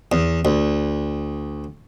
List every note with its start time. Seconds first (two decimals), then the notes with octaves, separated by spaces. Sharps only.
0.12 E2
0.45 D2